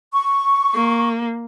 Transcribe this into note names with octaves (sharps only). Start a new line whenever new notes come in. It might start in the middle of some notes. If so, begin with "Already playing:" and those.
C#6
A#3